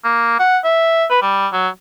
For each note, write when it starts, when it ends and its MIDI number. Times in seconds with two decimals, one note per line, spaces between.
0.04 0.39 58
0.39 0.58 78
0.64 1.05 76
1.10 1.20 71
1.22 1.48 55
1.53 1.68 54